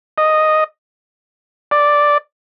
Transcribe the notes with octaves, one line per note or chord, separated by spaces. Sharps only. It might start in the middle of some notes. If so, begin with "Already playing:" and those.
D#5
D5